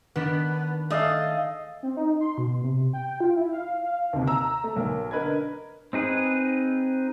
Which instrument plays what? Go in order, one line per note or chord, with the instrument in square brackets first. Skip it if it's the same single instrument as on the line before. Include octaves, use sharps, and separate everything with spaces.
[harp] D#3 D4 B6 [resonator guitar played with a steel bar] B3
[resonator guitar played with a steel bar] A3 [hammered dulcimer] G#4 D#5 F5
[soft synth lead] C4
D#4
C6
B2
C3
G5
F4
E4
F5
F5
[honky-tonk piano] D#2 C3
A#5 E6
A3
B1 A#4
D3 A#4 B4 D#5 G#6
[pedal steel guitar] C4 D#4 G#4 B4